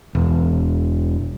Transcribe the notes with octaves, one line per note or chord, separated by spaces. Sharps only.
E1